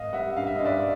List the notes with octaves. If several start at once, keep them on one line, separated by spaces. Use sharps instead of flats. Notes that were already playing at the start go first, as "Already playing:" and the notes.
Already playing: G#1 D#5 F5
G3 E5 F#5
G2 F5
E5
G2 D#5
D5 E5